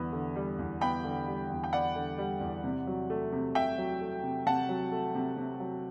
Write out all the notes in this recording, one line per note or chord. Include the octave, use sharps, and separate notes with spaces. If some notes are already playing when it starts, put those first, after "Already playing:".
Already playing: E2 D3 G3 B3
D3
G3
E2
B3 G5 B5
D3
G3
E2
G5
B3 D5 F#5
D3
G3
E2
C3
F#3
A3
C3
C3 E5 G5
F#3
A3
C3
C3 F#5 A5
F#3
A3
C3
C3
F#3